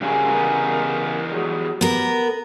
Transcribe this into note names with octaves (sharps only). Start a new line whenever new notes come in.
G2 C#3 F#3 G3 A#3 G#4
E2 B3 D#4 A#4
F#3 G3 G#4
B3 G4 A#4